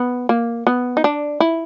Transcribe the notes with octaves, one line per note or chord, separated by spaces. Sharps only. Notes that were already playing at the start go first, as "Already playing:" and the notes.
Already playing: B3
A#3
B3
D#4
D4
E4